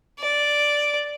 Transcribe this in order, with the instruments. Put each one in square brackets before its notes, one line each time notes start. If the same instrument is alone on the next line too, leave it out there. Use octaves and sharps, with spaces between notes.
[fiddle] D5